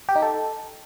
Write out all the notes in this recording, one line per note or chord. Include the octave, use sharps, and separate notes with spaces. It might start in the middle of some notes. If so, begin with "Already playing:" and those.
G4
D#4
A4